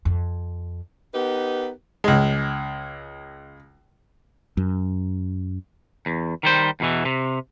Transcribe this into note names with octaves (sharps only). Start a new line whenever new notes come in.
F2
B3 D#4 G4 A#4 B4
C#2 G#3
F#2
E2
D#3 G3 C5
E2 B2 E3
C3